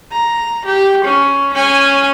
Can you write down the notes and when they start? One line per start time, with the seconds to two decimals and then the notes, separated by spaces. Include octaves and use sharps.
0.12 A#5
0.65 G4
1.05 C#4
1.54 C#4 G#5